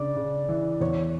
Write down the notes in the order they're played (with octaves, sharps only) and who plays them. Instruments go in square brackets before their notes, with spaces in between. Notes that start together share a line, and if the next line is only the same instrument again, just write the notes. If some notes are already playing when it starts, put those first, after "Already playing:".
Already playing: [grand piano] C#3 D4 [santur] D5
[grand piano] C#3
E3
[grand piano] E2 [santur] C#5